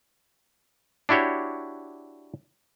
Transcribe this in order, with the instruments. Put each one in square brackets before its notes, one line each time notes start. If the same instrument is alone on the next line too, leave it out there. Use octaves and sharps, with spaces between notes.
[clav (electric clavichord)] D4 E4 F#4 G4 C#5